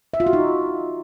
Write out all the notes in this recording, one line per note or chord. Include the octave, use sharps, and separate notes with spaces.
E5
F4
F#4
D#4